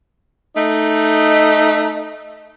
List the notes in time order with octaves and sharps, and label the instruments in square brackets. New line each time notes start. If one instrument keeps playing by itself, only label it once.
[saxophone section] A3 D#4